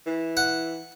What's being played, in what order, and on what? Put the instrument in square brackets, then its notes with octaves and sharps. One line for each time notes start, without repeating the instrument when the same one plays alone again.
[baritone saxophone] E3
[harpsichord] F#5